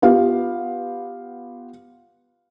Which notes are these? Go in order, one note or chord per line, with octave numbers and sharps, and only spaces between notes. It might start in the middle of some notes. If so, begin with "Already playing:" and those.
B3 F4 G4 F5